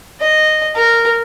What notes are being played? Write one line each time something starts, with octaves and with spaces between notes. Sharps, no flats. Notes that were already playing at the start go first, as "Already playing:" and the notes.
D#5
A#4